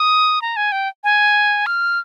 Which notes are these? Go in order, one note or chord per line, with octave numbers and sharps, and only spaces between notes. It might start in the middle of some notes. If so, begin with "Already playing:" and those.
Already playing: D#6
A#5
G#5
G5
G#5
F6